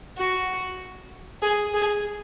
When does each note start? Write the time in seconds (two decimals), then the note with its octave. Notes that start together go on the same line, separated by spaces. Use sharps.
0.17 F#4
1.42 G#4
1.74 G#4